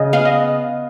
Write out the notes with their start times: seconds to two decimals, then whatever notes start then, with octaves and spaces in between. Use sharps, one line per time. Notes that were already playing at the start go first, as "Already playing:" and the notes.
Already playing: C#3 D#5
0.13 B3 F5
0.25 D#5